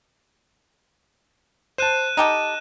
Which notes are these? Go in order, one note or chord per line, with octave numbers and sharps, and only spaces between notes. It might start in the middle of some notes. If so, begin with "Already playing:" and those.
C5 A5 F#6 D#7 E7
D#4 G4 A4 D#5